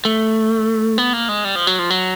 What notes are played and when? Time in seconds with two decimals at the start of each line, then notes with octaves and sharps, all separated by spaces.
0.05 A3
0.98 B3
1.13 A#3
1.29 G#3
1.45 G3
1.55 F3
1.67 F#3
1.79 F3
1.90 F#3